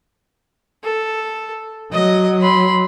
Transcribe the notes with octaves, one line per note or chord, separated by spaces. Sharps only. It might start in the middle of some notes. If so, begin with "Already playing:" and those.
A4
F#3 D#5
B5 C6